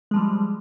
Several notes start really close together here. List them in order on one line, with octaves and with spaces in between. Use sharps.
G#3 F3 G3